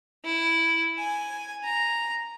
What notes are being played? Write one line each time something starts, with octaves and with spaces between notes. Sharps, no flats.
E4
G#5
A#5